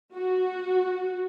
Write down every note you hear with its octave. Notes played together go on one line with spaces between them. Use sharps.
F#4